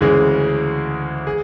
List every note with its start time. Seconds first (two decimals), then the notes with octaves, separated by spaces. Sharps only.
0.01 D2 C#3 E3 G#3 G#4
1.27 G#4